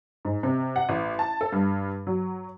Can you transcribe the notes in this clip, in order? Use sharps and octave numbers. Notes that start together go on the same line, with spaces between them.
G#2
C3
F#5
A1
A5
A4
G2
F#3